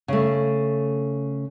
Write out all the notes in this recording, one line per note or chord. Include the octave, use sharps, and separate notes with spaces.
C#3 A3